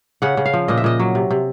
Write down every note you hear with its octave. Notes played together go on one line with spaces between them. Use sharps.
C#3 F#5
C#3
F5
F3
A#2 D#5
E5
A#2 D#5
F#3
C3
C3